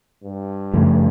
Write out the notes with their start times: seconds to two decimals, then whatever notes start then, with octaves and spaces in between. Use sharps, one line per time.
0.24 G2
0.74 F#2 C#3 F3 A3